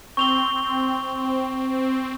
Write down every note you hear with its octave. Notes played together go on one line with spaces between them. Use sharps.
C4 C#6 F7 G7